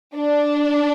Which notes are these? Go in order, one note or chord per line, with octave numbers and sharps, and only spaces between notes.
D4